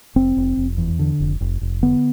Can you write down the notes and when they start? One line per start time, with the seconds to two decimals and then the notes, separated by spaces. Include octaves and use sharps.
0.16 F1 C4
0.37 F1
0.57 F1
0.78 E2
0.99 D3
1.20 F1
1.41 F1
1.61 F1
1.82 D3 B3